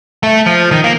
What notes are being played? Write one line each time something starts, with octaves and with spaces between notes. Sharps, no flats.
A3
F3
D#3
A#3